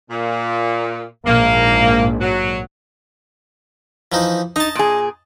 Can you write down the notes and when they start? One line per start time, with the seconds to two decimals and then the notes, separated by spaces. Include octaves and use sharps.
0.10 A#2
1.26 A#1 G#2 A#3
2.21 F#3
4.12 E3 F3 D#4
4.56 D#4 D#5 A5
4.75 A#2 G#4